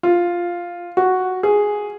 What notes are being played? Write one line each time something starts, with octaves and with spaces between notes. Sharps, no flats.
F4
F#4
G#4